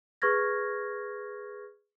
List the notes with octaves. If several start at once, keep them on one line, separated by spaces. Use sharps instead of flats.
G#4 B4 C#6 F6 G#6 A#6